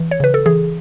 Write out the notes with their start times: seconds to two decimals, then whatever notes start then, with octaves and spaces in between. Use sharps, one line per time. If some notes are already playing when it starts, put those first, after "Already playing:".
Already playing: E3
0.11 C#5
0.20 C#3 B4
0.34 A4
0.46 E3 G#4